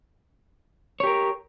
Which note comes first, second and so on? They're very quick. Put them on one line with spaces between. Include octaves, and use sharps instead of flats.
C#5 G4 A#4